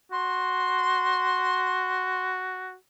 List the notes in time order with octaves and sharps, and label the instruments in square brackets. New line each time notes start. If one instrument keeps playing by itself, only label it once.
[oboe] F#4 [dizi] C6